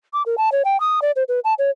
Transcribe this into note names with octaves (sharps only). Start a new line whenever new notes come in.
D6
A#4
A5
C#5
G5
D#6
D5
C5
B4
A5
C#5